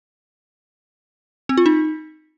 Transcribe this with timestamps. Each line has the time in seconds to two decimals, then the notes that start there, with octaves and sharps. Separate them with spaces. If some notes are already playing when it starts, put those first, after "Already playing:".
1.49 C4
1.57 F4
1.66 D#4